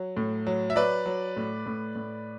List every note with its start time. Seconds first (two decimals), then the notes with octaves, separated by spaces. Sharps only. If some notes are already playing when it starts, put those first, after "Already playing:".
Already playing: F#3
0.17 A2
0.47 F#3
0.70 E5
0.76 F#3 B4 D5
1.06 F#3
1.37 A2
1.66 A2
1.96 A2